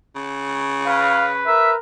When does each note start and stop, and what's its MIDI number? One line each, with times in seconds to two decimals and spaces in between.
0.15 1.54 49
0.86 1.77 71
0.86 1.26 77
1.47 1.77 70
1.47 1.72 76